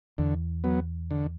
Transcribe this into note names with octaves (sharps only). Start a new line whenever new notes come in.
E2 D3
F#3 B3
D3